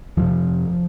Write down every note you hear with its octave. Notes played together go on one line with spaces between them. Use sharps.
F2 C3 F3